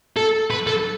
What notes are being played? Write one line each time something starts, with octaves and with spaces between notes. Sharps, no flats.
A4
B4
A4